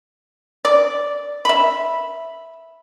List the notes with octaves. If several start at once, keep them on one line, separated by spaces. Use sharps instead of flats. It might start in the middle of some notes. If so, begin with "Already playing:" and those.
D5
E5 B5